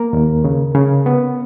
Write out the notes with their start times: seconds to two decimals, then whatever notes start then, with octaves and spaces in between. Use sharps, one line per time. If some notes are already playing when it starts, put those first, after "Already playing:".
Already playing: A#3 A#4
0.13 D#2
0.44 C#3
0.75 C#3
1.06 B3